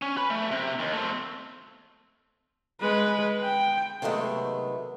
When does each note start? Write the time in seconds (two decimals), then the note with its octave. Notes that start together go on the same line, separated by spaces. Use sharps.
0.02 C#4
0.17 B4 B5
0.30 A3
0.51 C3
0.79 D#2
0.93 A3 C4
2.81 G#3 B4
3.44 G5
4.02 C3 D#3 F#3 G#3 A3 B3